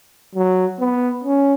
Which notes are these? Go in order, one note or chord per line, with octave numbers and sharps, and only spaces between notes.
F#3
B3
C#4